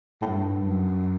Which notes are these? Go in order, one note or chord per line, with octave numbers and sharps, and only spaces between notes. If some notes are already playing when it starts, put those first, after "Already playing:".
A2
G2
F#2